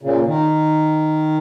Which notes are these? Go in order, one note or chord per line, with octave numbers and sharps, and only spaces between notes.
A#2 C#3
D#3